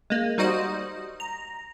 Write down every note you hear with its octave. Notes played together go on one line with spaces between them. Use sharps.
G#3 A#3
G3 D#4 F#4 C5 D#5
A#5